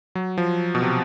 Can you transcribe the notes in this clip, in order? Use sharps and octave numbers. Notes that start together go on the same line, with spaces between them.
F#3
F3
B2
C3